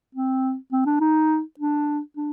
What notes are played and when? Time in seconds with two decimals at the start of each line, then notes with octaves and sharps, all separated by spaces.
0.15 C4
0.72 C4
0.86 D4
1.00 D#4
1.59 D4
2.16 D4